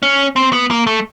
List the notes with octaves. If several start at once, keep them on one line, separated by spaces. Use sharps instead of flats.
C#4
C4
B3
A#3
A3